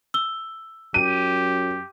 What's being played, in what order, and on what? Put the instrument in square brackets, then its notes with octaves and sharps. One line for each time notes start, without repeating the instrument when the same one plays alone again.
[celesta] E6 G7
[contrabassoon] F#2 [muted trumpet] G4 [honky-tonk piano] D#7